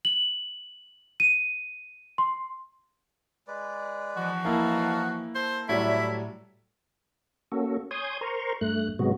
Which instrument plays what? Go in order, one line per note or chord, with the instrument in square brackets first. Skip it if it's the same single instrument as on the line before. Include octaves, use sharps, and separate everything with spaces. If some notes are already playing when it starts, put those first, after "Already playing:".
[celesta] F#7
D#7
C6
[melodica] G#3 B4 D5
[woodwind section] E2 E3 F3 [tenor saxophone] F#4
[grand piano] A#3 E4 [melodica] D#4 F5 A5
[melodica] A4 [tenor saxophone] C5
[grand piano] A2 F#3 G3 [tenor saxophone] E4 [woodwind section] D5 E5
[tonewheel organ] A#3 C#4 F#4 A4
C#5 G#5 C6 D#6 G6 G#6
A#4 C5 A#5 C6 C#6
G2 A3 F#6
G#2 C3 F#3 G#3 B3 F#4